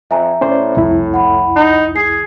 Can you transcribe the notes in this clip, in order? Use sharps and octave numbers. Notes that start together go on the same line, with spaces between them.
F2 E5 G#5 A#5
A2 C#4 C5 D5
C2 F2 E4
F#5 B5
D#4
G#4 C7